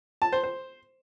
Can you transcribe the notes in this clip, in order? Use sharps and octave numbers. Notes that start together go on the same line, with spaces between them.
A5
C5
C5